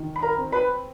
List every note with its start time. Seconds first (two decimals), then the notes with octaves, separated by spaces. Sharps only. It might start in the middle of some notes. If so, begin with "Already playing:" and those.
Already playing: D#3
0.16 B5
0.22 A#4 A#5
0.37 C4
0.52 B4 B5